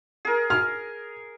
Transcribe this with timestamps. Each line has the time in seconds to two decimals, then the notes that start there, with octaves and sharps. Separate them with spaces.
0.25 G#4 A#4
0.50 F6